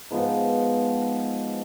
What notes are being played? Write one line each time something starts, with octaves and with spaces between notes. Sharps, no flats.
G#2 F3 B3